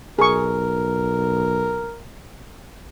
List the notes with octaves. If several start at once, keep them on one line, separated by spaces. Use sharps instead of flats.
B1 G#4 A#4 C#6